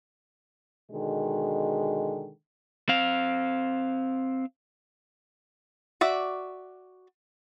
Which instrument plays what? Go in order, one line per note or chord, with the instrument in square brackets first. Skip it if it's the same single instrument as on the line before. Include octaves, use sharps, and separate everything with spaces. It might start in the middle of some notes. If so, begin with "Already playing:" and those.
[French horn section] B2 D3 D#3 G#3
[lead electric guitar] C4 F5
[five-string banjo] F#4 D5 E5